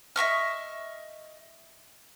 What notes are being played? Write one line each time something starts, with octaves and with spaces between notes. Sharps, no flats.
D#5 E5 C#6 F6